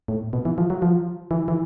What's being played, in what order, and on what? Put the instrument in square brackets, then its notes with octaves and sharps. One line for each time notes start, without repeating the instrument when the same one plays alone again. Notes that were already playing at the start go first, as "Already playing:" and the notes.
[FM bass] A2
B2
E3
F3
F#3
F3
E3
E3